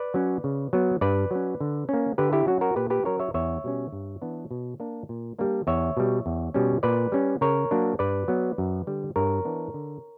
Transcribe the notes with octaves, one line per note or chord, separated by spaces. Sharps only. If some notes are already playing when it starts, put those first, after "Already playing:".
Already playing: B4 D5
F#3 C#4
C#3
F#3 B3
G2 B4 D5
F#3 C#4
D3
A#3 C#4
D3 G4 B4
E4 G4
F#3 C#4 F#4
F#4 A#4
A#2 G4 B4
G4 B4
F#3 C#4 A#4 C#5
C#5 E5
E2 C#5 E5
B2 G3 C#4
G2
E3 B3 D4
B2
A#3 D4
A#2
G3 A#3 D4
E2 C#5 E5
B2 G3
E2
B2 G3 C#4
A#2 B4 D5
G3 C#4
C#3 A#4 C#5
F#3 A#3 D4
G2 B4 D5
F#3 B3
F#2
D3 G3
G2 A#4 C#5
E3 B3 D4
D3